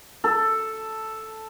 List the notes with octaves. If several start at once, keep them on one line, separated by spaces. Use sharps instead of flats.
A4